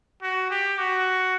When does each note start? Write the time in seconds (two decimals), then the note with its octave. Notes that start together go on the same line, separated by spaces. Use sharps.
0.22 F#4
0.50 G4
0.78 F#4